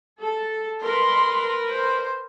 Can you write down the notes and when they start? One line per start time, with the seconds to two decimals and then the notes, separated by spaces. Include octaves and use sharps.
0.21 A4
0.83 A#4 B4 C6
1.69 C5